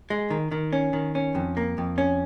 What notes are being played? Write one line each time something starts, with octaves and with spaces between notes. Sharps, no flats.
G#3
D#3
D#3
C#4
D#3
C#4
F2
A#3
F2
C#4